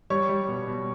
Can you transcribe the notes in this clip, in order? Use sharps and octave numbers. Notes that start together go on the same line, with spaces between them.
G3 C#5 C#6
G3
B2
B2